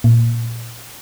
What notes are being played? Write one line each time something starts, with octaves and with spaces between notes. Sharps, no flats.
A#2